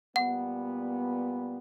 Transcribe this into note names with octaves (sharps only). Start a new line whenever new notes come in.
A#2 G3 B3 F#5